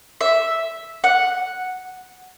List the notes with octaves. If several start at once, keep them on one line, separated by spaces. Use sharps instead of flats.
E5
F#5